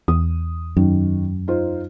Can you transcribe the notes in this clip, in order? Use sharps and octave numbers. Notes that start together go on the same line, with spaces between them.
E2 D#6
F#2 D#3
D#4 F4 C5